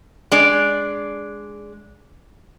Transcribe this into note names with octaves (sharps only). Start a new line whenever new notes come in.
G#3 D4 D5